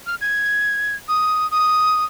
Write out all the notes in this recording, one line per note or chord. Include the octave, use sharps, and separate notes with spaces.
F6
G#6
D#6
D#6